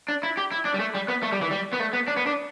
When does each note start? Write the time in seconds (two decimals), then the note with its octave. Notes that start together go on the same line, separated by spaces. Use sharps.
0.08 D4
0.23 E4
0.37 G4
0.52 E4
0.65 D4
0.74 G3
0.80 A3
0.95 G3
1.08 B3
1.23 A3
1.32 G3
1.42 E3
1.51 G3
1.73 B3
1.80 A3
1.93 B3
2.08 D4
2.17 B3
2.27 D4